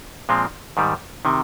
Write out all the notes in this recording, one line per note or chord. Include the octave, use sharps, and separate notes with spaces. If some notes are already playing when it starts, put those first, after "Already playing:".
A#2 F3 G#3 C4
G#2 D#3 G3
C3 D#3